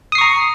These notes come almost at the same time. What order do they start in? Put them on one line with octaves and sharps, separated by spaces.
D#6 C7 C#6 A#5